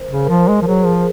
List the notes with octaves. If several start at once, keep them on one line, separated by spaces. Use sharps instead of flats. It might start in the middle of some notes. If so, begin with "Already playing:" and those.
Already playing: A#4 C5
C#3
A#4
F3 C5
G#3
F3
F#3 G#4
F3